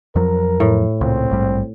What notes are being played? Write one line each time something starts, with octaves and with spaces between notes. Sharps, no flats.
F2 F3 F#3 A#4
A2
C#2 A#2 C4
A#1 G#2 G3